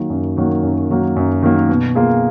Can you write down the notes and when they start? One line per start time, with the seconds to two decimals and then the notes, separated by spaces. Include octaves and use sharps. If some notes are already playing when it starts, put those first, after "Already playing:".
Already playing: D#3 F#3 A#3
0.10 F#2
0.37 D#3 F#3 A#3
0.63 F#2
0.89 D#3 F#3 A#3
1.16 F#2
1.43 D#3 F#3 A#3
1.69 B2
1.95 A#3 F4 G#4